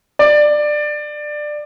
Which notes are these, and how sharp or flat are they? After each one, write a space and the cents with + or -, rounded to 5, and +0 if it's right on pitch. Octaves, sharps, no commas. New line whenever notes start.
D5 +15